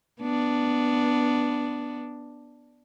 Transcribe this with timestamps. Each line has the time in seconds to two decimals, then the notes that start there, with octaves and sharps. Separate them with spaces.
0.21 B3 D4